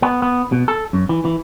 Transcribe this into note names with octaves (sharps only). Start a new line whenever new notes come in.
B3
B3
B2
A4
F#2
E3
E3